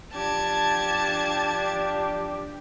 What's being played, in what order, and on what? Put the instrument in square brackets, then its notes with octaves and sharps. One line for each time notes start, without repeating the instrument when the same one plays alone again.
[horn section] F3 D4 G4 [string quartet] A5 G#6